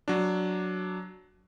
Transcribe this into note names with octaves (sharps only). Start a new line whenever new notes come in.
F#3 D4